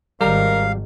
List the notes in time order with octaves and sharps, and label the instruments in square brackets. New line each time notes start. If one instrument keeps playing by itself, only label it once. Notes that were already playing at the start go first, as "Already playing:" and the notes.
[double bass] G#1 D#3 [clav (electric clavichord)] G3 A#5 [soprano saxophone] A#4 [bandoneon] F5